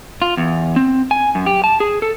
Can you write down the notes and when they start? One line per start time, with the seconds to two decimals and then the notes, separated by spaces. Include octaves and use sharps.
0.22 F4
0.37 E2
0.76 C4
1.11 G#5
1.35 F#2
1.46 G4
1.64 A5
1.80 G#4
2.02 A4